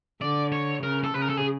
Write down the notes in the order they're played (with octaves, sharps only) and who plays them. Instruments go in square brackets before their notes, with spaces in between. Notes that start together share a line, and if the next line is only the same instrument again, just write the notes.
[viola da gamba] D3 [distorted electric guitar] D5
[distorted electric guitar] C#5
[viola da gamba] C#3 [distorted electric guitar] A#4
[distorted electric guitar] A4
[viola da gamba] C#3 [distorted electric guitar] B4
[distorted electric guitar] A#4
A4
G#4